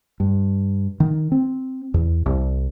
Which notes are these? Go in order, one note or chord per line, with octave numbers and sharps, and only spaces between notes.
G2
D#3
C4
E2
C2